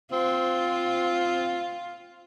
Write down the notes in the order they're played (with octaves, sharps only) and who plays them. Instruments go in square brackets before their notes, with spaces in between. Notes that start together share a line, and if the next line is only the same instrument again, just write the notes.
[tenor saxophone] C4 [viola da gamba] F4